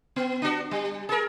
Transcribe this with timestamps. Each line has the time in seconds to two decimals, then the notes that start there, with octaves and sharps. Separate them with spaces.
0.16 B3
0.42 D4 F#4
0.71 G3
1.09 G#4 A#4